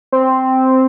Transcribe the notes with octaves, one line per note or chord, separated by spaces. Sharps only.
C4